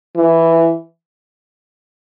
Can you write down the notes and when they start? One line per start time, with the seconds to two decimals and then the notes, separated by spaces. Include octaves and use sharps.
0.16 E3